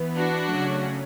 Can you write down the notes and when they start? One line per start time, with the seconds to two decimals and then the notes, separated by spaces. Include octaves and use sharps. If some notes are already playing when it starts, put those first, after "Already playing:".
Already playing: E3 B3
0.16 D4 F#4
0.50 C#3 F#3 A3 C#4